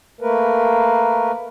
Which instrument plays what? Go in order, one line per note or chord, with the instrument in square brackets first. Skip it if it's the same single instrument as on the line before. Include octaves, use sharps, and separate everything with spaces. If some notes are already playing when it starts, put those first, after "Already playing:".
[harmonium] A3 A#3 A#4 B4